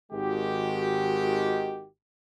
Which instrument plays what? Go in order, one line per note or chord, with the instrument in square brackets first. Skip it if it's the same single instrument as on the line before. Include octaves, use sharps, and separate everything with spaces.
[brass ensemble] G#1 D#3 G#3 F#4 G4